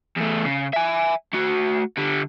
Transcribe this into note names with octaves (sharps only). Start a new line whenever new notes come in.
E2 A3
C#3
E5 G#5
A3 F#4
D3 G3